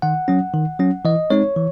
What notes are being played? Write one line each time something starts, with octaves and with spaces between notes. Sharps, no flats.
D#3 F#5
F#3 C#4
D#3
F#3 C#4
E3 D#5
G#3 C4 D#4 C#5
E3